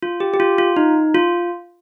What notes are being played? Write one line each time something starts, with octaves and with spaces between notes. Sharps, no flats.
F4
G4
G4
F4
F4
D#4
F4